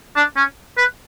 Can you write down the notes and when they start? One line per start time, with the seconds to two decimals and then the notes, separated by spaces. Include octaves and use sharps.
0.16 D4
0.36 C#4
0.77 B4